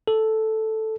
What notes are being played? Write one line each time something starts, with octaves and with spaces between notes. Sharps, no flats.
A4